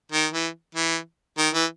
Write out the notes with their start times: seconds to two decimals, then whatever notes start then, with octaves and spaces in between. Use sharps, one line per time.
0.12 D#3
0.33 E3
0.75 E3
1.38 D#3
1.54 E3